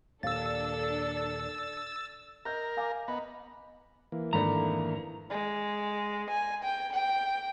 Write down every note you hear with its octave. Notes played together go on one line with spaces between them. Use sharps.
D#2 A#2 D4 A4 F5 E6 A6
A#4 D#5 G6
F5 G#5 D6
B3 D#5 A#5
E3 A#3
F2 G#2 D#3 A3 D4 A#5 B5
G#3
G#5
G5
G5